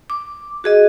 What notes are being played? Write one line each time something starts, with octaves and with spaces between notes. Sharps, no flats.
D6
F#4 G#4 D#5